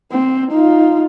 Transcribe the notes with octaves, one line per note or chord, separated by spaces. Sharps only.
C4
D#4 F4